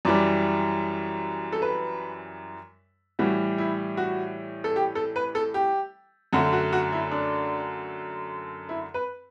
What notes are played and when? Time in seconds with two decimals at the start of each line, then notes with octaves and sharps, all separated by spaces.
0.05 F#2 E3 G3 D5
1.52 A4
1.62 B4
3.19 A2 E3 G3 F#4
3.58 E4
3.97 F#4
4.64 A4
4.76 G4
4.95 A4
5.16 B4
5.35 A4
5.54 G4
6.33 F#2 D3 A3 F#4
6.53 F#4
6.73 F#4
6.92 E4
7.11 D4
8.69 E4
8.94 B4